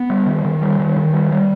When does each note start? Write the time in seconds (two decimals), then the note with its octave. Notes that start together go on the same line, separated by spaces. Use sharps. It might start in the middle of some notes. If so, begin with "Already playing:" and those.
Already playing: B3
0.10 G3
0.26 D#3
0.45 D#3
0.62 G3
0.79 D#3
0.97 D#3
1.13 G3
1.31 G3